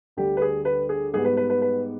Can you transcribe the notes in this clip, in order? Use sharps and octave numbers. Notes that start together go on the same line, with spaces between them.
D2 D3 G3 G4
B4
G#4
B4
G#4
G#2 G3 B3 G#4
B4
B4
B4
B4